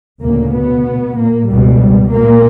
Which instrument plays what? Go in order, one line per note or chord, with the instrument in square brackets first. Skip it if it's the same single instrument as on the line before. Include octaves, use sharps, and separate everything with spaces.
[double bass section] D2 A#2 C#3 A#3
B2 B3
A#2 A#3
C#2 G2 B2 G3
A#2 A#3